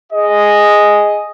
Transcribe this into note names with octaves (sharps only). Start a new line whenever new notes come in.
G#4 D#5